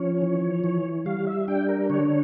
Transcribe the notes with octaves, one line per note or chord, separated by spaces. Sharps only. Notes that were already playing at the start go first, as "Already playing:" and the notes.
Already playing: F3 C#4 C#5
E3
E3
G3 F5
E5
D4 G5
A#4
D3 C#5